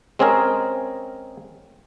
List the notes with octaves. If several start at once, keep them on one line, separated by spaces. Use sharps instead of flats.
G#3 C4 C#4 G#4 A#4